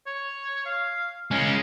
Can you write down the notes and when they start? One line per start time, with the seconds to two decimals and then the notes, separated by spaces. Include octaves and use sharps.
0.07 C#5
0.66 F5
1.31 G#3 C#4 A#4